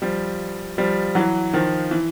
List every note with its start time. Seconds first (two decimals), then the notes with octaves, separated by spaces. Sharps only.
0.02 F3 G3
0.78 F3 G3
1.15 E3 F#3
1.53 D#3 F3
1.91 E3